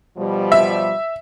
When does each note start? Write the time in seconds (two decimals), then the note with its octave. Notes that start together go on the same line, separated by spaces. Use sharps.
0.18 B2 F3 G3
0.52 E5